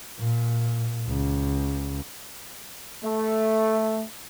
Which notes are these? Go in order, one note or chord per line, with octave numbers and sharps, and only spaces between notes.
A#2
C#2
A3